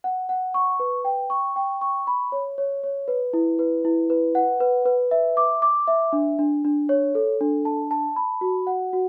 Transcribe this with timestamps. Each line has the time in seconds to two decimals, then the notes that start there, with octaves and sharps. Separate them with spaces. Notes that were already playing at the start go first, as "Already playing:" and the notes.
0.04 F#5
0.29 F#5
0.54 C#6
0.80 B4
1.05 G5
1.30 C#6
1.56 G5
1.81 C#6
2.07 B5
2.32 C#5
2.58 C#5
2.83 C#5
3.08 B4
3.33 E4
3.59 B4
3.85 E4
4.10 B4
4.35 F#5
4.60 B4
4.86 B4
5.11 E5
5.37 D6
5.62 D6
5.88 E5
6.13 D4
6.39 D4
6.65 D4
6.89 C#5
7.15 A4
7.41 D4
7.65 A5
7.91 A5
8.16 B5
8.41 F#4
8.67 F#5
8.93 F#4